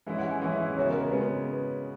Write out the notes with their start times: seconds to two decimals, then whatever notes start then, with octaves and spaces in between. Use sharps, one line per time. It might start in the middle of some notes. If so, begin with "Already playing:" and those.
0.07 E3 G#3 C#4 E4 E5
0.18 F#5
0.30 G#5
0.41 E3 G#3 C#4 E4 F#5
0.53 E5
0.65 E5
0.77 C#3 G#3 B3 F#4 C#5
0.88 A#4
1.00 A#4
1.11 C#3 G#3 B3 B4